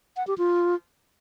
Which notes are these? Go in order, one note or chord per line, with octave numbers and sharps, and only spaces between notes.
F#5
G4
F4